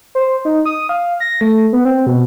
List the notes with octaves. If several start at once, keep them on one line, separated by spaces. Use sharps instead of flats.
C5
D#4
D#6
F5
A#6
A3
B3
C4
B2